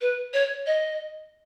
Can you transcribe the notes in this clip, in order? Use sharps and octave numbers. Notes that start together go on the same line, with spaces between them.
B4
C#5
D#5